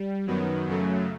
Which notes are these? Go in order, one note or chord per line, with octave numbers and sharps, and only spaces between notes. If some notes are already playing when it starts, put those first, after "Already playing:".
Already playing: G3
F#2 D#3 F#3 B3
F#2 C#3 F#3 A3